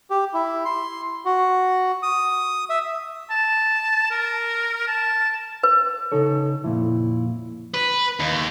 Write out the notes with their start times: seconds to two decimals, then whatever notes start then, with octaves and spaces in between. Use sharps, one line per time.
0.10 G4
0.34 E4
0.65 C6
1.25 F#4
2.03 D#6
2.70 E5
3.30 A5
4.11 A#4
4.88 A5
5.63 B4
6.12 C#3 D#4 A4 C#5
6.64 F2 A#2 E4
7.74 B4
8.20 D#2